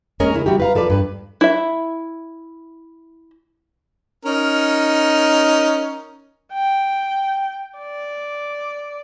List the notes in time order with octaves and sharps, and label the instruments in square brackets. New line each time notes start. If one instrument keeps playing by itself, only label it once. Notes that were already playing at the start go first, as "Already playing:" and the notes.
[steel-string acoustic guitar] G#3 A#3 C#4 G#4 A#4 C#5
C#3 E4
G3 E4 F#4 G4
B4 F5 A#5
F3 A4 B4 D5
G2 B4
[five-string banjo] E4 E5
[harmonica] C#4 D#4 A#4
[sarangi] G5
D5